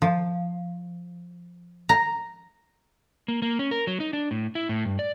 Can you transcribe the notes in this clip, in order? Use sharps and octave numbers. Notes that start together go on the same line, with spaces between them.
F3
A#5
A#3
A#3
C#4
A#4
F#3
D#4
D4
A2
E4
A2
G2
D5